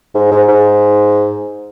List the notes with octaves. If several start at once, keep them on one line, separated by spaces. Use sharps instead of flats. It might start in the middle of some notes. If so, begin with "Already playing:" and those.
G#2
G#2
G#2